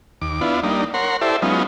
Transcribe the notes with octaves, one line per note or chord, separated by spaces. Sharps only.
D#2 D6
B3 D4 E4 F4
G3 A#3 D4 D#4
A#4 C#5 F#5 C6
E4 G4 A4 C5 D5 E5
F#3 G#3 B3 C#4 D#4 F4